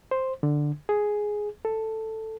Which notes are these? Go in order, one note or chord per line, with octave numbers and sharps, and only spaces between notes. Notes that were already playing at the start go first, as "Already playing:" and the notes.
C5
D3
G#4
A4